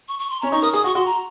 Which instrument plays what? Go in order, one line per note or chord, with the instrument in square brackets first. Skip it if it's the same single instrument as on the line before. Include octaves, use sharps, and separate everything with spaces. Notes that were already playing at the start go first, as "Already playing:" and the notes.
[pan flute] C#6
C#6
C6
[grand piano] C#4 [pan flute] A#5
[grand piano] D#4 [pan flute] C#6
[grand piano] A#4 [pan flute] D#6
[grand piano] G#4 [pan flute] D#6
[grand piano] F#4 [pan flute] C#6
[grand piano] F#4 [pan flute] C6
[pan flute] A#5